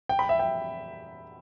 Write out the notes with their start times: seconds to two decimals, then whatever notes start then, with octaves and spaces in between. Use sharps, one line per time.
0.09 G5
0.19 B5
0.29 E5
0.39 G5